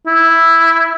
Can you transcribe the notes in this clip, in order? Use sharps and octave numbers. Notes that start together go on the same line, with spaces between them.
E4